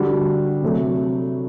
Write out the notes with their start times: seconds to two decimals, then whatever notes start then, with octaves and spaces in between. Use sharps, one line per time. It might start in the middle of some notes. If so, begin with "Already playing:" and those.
Already playing: D3 G3 D4 F#4
0.62 C3 F#3 A3